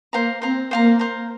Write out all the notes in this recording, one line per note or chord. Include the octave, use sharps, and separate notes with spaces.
A#3 C5 F5 A#5
C4 C5 F5 A#5
A#3 C5 F5 A#5
C5 F5 A#5